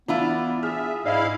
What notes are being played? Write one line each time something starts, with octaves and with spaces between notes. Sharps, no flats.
E3 B3 D4 E4 F4
G#4 E5 F6
G#2 D4 E4 D#5 F5